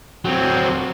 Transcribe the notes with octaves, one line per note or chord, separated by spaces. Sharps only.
F#3 C4